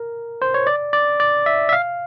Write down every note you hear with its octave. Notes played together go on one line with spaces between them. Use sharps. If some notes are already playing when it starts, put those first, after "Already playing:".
Already playing: A#4
C5
C#5
D5
D5
D5
E5
E5
F5